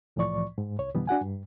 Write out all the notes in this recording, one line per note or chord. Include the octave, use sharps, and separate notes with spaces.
C2 A2 E3 F3 D5 C#6
G#2
C2 C#5
F2 B2 D3 E3 G3 B3
D4 F#4 F#5 G#5
G2